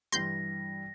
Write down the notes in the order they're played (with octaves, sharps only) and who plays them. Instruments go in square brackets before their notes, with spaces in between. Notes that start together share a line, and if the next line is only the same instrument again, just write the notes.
[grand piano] G2 E3 G3 [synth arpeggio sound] C6 G6 [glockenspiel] A#6